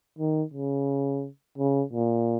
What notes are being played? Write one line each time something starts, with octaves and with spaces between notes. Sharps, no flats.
D#3
C#3
C#3
A#2